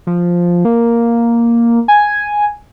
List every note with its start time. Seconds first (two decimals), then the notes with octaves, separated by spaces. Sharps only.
0.07 F3
0.65 A#3
1.88 G#5